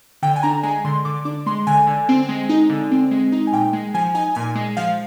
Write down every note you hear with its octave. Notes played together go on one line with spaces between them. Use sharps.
D3 G5
G#5
D4 A#5
G#3 G#5
D3 C6
D3 D6
D4 D6
G#3 C6
D3 G#5
D3
C4
G#3
D#4
D3
C4
G#3
D#4
G#5
A#2 G5
G#3
F3 G#5
D#4 G#5
A#2 G#5
G#3
F3 F5